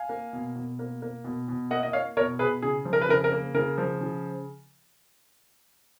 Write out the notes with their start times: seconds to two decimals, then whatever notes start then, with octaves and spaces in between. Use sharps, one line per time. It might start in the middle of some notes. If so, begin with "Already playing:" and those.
Already playing: F5 G#5
0.09 A#3
0.33 B2
0.56 B2
0.79 A#3
1.02 A#3
1.24 B2
1.48 B2
1.71 A#3 D#5 F#5
1.83 D#5
1.93 A#3 C#5 F5
2.17 B2 A#4 C#5
2.39 B2 G#4 B4
2.62 C#3 G#4
2.85 F3
2.93 A#4
3.01 B4
3.09 C#3 A#4
3.24 A#4
3.32 A#3
3.54 C#3 A#4
3.78 F3
4.01 C#3